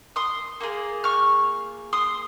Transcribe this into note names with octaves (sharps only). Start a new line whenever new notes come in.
C6 D#6
A#3 F4 G#4
C#6 F6
C6 D#6